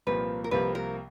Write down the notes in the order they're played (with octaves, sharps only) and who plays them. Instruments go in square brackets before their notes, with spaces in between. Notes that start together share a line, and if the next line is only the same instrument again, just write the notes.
[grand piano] C2 A#2 F3 A#3 [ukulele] B4
[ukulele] A#4
[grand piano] C2 C3 F3 A#3 [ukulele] B4
[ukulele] A#4